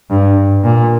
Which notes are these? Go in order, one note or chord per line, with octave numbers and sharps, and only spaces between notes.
G2
A#2